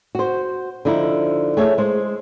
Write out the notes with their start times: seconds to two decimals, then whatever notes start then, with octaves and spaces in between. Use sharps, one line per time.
0.15 F#4 C5
0.85 D3 F3 D#4 E4
1.57 A3 G#4 C#5 E5
1.78 G#3 C5